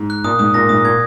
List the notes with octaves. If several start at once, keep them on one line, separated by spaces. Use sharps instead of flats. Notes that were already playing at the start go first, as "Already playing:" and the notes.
Already playing: G#2
F#6
A#2 D#6
G#2 D#6
A#2 A#6
G#2 D#6
A#2 G#6